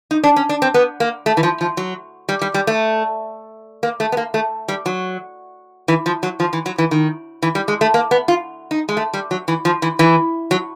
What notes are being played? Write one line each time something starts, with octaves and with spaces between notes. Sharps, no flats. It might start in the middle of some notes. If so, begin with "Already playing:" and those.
D#4
D4
C#4
D4
C4
B3
A#3
A3
E3
F3
F3
F#3
G3
G3
G3
A3
A#3
A3
B3
A#3
A3
G3
F#3
E3
F3
F#3
F3
E3
F#3
E3
D#3
E3
G3
G#3
A3
A#3
B3
F4
D#4
G#3
A3
G3
F#3
E3
F3
E3
E3
F#3